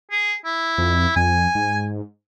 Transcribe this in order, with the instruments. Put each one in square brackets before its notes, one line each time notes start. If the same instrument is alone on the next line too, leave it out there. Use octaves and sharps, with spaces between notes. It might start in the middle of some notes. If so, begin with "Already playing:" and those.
[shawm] G#4
E4
[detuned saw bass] F2
[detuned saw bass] F2 [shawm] G#5
[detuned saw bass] G#2